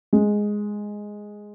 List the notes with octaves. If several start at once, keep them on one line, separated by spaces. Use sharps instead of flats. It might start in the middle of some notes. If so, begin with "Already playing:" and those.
G#3